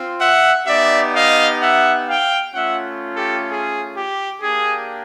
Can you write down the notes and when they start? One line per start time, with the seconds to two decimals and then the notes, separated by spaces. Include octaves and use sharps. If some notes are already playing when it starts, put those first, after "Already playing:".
Already playing: C4 F4
0.20 E5 F#5
0.67 B3 D#4 G4 D5 E5
1.14 D#5 F5
1.61 E5 F#5
2.07 F5 G5
2.54 A3 C#4 F4 E5 F#5
3.16 G4 A4
3.49 G#4
3.96 G4
4.41 A#3 D4 G4 G#4